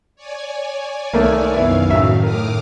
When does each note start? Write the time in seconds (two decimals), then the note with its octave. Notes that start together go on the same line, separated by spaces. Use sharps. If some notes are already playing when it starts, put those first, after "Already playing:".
0.16 C#5 D5 G#5
1.13 C2 D#3 A3 A#3
1.54 F#2 D#3 B3 E4 F5
1.90 A2 C#3 F#3 E5
2.23 A#4 D6 D#6 F6